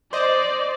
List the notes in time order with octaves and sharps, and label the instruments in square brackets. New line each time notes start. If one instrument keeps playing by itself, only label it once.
[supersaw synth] C5 D#5 [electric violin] D5